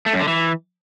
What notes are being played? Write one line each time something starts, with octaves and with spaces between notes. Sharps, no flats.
A3
F#2
D3
E3